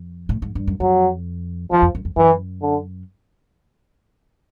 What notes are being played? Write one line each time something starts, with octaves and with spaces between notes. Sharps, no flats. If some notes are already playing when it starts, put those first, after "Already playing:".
Already playing: F2
A2
G#2
G2
F#2
F2 F#3
E2 F3
F2
F#2
F2
F#2 E3
D3